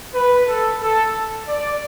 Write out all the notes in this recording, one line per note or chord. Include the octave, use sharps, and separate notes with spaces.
B4
A4
A4
D5